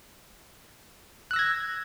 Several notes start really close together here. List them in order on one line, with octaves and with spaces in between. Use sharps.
F#6 E6 A#6 G#6